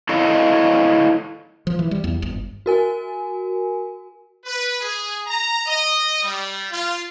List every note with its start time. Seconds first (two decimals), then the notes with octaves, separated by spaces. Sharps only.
0.09 E4 A4 C#5 D#5 F5
1.67 F3
1.79 E3
1.91 G3
2.04 E2
2.22 G1
2.66 F#4 A#4 G#5
4.45 B4
4.81 G#4
5.27 A#5
5.67 D#5
6.22 G3
6.70 F4